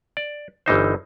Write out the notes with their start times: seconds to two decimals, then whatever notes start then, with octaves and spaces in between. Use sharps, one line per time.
0.17 D5
0.66 G1 E3 D#4 C5